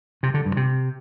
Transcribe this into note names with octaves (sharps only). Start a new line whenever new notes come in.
C3
D3
G2
C3